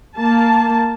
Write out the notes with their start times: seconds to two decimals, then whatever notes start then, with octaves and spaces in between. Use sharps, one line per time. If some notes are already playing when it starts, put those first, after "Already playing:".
0.16 A#3 A5